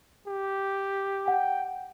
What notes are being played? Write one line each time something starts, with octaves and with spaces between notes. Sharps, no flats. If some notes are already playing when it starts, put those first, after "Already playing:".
G4
F#5 G5